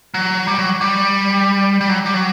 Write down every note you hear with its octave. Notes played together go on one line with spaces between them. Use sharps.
F#3
G3
F#3
G3
G3
F#3
G3
F#3